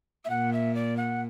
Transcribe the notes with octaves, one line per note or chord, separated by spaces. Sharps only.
E5
A#2 F#5
E5
D5
F#5